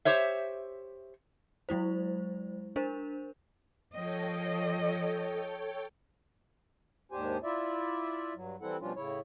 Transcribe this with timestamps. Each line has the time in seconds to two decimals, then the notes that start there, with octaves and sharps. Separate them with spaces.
0.05 G4 C5 C#5 E5
1.69 F#3 G#3 E4 C5
2.76 D4 A#4 C5
3.93 F3 A4 C#5 D#5 G5
7.12 D#2 G#2 D4 G4 C5 G#5
7.44 E4 F4 D5 E5
8.35 G2 F#3
8.61 E3 G3 C4 E4 A4 F#5
8.80 B2 F3 G3 C#4 D4 F4
8.96 A2 C#3 E4 C#5